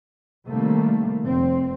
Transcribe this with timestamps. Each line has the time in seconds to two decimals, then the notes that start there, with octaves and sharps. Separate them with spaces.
0.49 C3 D#3 G3 A3 A#3
1.23 F1 C4